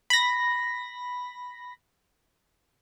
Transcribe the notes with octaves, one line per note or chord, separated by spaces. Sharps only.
B5 A#6